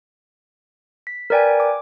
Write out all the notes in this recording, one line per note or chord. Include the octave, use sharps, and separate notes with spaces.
B6
A#4 B4 D5 G5 G#5
D6